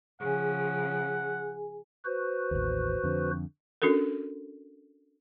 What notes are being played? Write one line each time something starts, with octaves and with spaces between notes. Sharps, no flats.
C#3 F3 G#4 F#5 G#5
F#4 B4 C5
A1 D#2
F2 D3
C#4 D4 F#4 A4 A#4